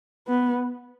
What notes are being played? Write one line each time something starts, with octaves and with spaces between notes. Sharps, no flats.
B3